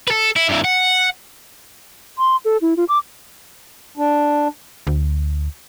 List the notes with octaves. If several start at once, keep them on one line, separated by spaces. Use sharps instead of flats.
A4 B4
E4
G2 E3
F#5
C6
A4
E4
F4
D6
D4
D2